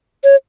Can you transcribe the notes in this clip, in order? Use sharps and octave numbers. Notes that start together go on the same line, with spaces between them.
C#5